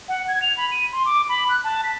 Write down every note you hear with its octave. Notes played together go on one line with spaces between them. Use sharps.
F#5
G#6
F7
B5
D#7
C6
D6
B5
F#6
A5
B6